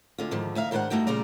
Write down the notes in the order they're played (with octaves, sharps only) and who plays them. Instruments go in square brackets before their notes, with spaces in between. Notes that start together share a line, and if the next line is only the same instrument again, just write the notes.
[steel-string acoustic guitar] D2 D3 F4
G#2 D3 D#3 F3
D2 D#4 E5 F5
G#2 D#3 D4 E4 C5 F#5
G2 D3 A3 D#4 F#4 G5
A#2 C#3 G3 F4 D5 A#5